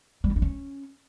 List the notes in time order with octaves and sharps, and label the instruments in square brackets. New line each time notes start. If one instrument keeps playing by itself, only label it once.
[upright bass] G3
E4
D#4
C#4